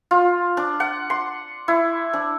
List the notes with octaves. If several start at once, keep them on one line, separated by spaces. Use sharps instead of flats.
F4
D4
F#5
C6
E4
D4